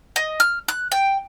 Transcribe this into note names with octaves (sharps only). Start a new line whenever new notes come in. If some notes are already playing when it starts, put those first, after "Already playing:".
D#5
F6
F#6
G5